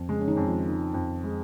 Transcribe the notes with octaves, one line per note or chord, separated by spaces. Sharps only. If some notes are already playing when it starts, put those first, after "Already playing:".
Already playing: F2
C#3 G#3 C#4
C#4
D#3 D#4
F2
F3 F4
D#3
F2
G#3